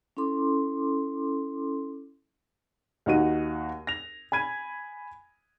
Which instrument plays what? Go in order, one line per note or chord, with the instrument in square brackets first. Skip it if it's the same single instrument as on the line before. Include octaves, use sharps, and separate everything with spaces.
[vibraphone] C#4 E4 A4 C6 D6
[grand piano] D#2 D#4 F#4 D#7
A#6 F7
G#5 B5 G#6 D#7